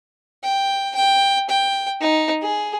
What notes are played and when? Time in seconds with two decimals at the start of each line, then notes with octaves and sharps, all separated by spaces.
0.43 G5
0.95 G5
1.50 G5
2.01 D#4
2.42 G#4